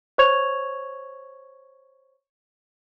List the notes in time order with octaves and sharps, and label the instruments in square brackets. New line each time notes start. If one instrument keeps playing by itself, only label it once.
[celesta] C5 C#5 C#6 G#6 F7